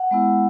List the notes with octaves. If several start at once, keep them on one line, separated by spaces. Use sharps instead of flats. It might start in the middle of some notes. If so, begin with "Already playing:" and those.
Already playing: F#5
G#3 B3 E4